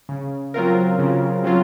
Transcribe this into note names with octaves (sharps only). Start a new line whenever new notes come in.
C#3
F#3 C4 F4 A#4
C#3
F#3 C4 F4